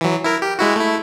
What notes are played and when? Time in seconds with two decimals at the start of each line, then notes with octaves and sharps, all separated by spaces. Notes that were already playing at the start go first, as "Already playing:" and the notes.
0.01 E3 F#3
0.24 E4 A#4
0.42 G4
0.59 G#3 E4 F#4
0.76 A3 E4